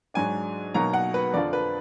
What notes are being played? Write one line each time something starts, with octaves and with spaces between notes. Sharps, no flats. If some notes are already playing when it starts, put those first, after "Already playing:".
G#2 F#3 D4 G#5
B2 F#3 A#3 D#4 A#5
F#5
B4
F2 D3 F3 D5
B4